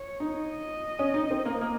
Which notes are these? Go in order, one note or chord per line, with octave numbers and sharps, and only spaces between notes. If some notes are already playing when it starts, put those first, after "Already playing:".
Already playing: C#5
D#4
D#5
C#4
D#4
C4
A#3
A#3